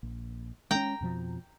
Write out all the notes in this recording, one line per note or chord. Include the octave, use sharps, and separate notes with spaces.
A#1
G#3 A3 C#4 G5 A#5
F2 B2 F3